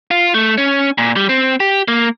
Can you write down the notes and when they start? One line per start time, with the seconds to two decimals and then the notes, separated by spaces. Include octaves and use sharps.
0.11 F4
0.34 A3
0.58 C#4
0.98 A#2
1.16 G3
1.29 C4
1.60 G4
1.88 A#3